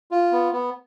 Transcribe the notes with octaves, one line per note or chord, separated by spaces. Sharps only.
F4
B3
B3